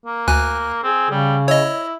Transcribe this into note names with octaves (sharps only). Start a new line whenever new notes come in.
A#3
D2 G#5 F#6
C4 G#4
C#3 G3
E4 C#5 D#5